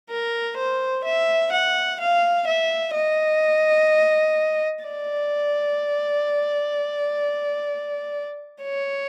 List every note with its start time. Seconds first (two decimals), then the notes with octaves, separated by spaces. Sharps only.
0.10 A#4
0.58 C5
1.04 E5
1.52 F#5
2.00 F5
2.47 E5
2.94 D#5
4.84 D5
8.62 C#5